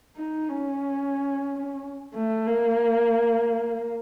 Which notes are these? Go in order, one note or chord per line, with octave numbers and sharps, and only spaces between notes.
D#4
C#4
A3
A#3